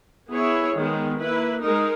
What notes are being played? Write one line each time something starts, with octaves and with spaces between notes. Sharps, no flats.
B3 E4 G#4 C#5
D#3 G#3 B3 D#4
A#3 E4 B4
G#3 D#4 A#4